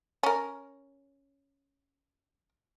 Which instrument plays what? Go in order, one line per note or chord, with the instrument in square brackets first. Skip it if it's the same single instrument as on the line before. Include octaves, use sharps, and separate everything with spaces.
[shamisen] C#4 A#4